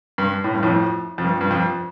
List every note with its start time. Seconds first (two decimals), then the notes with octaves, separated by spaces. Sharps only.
0.18 G2
0.44 A2
0.54 G2
0.63 F2 A2
1.18 F2
1.24 G2
1.41 G2
1.51 F2